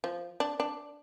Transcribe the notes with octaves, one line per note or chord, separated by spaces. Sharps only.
F3
D4
D4